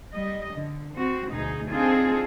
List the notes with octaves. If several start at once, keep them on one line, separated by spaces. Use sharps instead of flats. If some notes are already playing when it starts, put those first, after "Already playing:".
G3 D#5
D3
C4 F#4
D2 B2 D#4 G#4
C4 D4 D#4 F4 G#4 A4